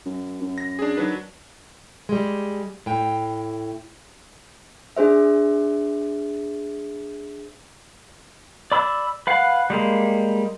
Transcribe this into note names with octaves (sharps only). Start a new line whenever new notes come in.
F#2
F#2
A#6
D4 G#4
D#3 F#3 D4 B4
G3 G#3
A2 G5
D4 G#4 C5 E5
D5 B5 E6
B4 F5 F#5
G3 G#3 A#3